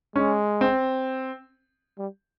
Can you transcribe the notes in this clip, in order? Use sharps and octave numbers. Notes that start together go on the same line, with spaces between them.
G#3 C#4
C4
G3